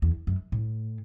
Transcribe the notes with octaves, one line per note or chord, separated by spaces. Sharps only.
E2
F#2
A2